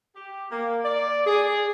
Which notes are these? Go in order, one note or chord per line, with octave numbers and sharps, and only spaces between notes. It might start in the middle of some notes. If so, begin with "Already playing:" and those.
G4
A#3
D5
G#4